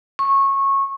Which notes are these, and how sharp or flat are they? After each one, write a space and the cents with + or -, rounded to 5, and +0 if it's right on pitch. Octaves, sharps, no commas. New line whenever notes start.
C#6 -20